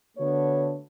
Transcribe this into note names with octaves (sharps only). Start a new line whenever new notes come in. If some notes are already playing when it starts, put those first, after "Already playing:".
D3 A3 B3 D4 F#4 C#5